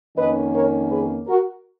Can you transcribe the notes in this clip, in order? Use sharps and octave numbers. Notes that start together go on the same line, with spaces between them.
F2 D#3 A#3 C#4 B4 D#5
A#4 C#5
G#4 B4
F#4 A#4